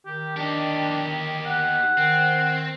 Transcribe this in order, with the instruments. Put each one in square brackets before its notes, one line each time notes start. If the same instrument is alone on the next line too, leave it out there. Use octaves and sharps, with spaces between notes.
[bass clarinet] D#3 [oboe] G4
[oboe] D4 [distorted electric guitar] D#4 G4
[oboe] F#5
[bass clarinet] D#3 [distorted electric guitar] C4